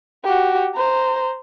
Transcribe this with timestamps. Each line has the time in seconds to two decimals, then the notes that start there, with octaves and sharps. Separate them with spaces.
0.24 F#4 G4
0.75 C5 A#5